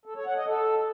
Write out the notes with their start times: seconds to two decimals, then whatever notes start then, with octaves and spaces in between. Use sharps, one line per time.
0.05 A4
0.16 C#5
0.26 F#5
0.36 D#5
0.47 A4